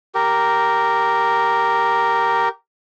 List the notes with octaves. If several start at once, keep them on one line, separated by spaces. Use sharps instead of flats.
G4 A#4